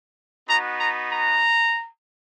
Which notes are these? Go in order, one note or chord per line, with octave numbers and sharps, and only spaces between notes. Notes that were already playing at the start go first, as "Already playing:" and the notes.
B3 D#4 F#4 A#5
A#5
A#5